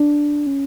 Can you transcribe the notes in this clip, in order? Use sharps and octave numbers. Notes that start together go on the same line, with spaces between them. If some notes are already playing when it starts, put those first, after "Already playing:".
Already playing: D4
C#4